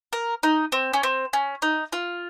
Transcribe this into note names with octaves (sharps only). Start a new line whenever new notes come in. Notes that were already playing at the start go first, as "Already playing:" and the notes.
A#4
D#4
C4
C#4
C4
C#4
D#4
F4